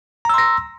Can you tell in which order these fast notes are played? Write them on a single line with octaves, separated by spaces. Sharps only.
A#5 E6 C6 A#6